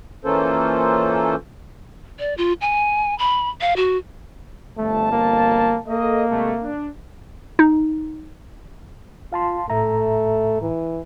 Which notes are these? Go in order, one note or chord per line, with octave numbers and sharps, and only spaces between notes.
E3 A#3 C#4 F4 A4 C5
D5
F4
G#5
B5
F5
F#4
G1 F2 A3 A5
A#3
A#3 A4 D#5
C3 G#3 A3
D4
D#4
F4 F5 A5 C6
A2 A3 E5 A#5
E3